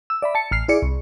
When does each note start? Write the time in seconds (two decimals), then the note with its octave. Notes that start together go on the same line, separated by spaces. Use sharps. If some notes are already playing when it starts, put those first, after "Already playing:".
0.10 E6
0.22 D5 E5 B5
0.35 A5 C#7
0.51 A1 F6 C7
0.68 E4 G#4 D5 C#7
0.82 C2